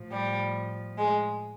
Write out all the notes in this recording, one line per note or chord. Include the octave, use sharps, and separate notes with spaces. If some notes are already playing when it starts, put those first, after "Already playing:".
Already playing: A2 F3
G3
G#3